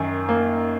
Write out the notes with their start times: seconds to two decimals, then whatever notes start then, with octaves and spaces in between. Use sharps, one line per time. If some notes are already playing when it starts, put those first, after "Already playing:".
Already playing: F#2 D#3
0.29 A#3